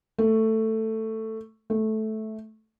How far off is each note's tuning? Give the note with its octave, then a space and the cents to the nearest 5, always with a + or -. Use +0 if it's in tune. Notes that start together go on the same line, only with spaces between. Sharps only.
A3 +10
A3 -10